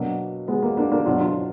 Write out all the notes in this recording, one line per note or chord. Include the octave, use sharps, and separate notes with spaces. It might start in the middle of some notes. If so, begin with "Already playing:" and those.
Already playing: B2 F#3 A#3 D4
G#3 B3
A#3
A#3 D4
A#3 D4
B2 F#3 D4 F4
D4 F4